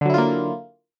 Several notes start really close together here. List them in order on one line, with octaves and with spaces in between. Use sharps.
D3 F#3 E4 F4 A#3